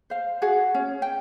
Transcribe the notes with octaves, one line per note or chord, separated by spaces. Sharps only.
C5 F5
F#4 G#4 F#5
C#4
G5